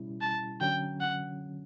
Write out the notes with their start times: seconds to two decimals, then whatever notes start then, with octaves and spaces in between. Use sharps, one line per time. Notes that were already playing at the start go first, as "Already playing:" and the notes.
Already playing: B2 G3 C#4 E4
0.21 A5
0.61 D3 F#3 C#4 G5
1.00 F#5